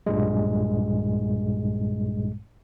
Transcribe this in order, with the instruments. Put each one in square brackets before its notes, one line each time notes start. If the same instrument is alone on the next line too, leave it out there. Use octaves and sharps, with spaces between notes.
[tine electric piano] B1 G2 A#2 G3 G#3